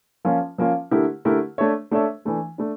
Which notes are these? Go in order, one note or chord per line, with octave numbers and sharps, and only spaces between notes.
F3 A#3 C#4 F4
F3 A#3 C#4 F4
D3 A3 E4 G4 A#4
D3 A3 E4 G4 A#4
A3 D4 A4 C#5 E5
A3 D4 A4 C#5 E5
E3 A3 D4
A3 D4